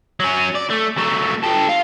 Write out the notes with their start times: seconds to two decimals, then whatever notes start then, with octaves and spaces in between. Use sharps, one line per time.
0.20 F#3 C#4
0.55 D5
0.70 A3
0.98 F#3 A3
1.44 G4 A4
1.69 F4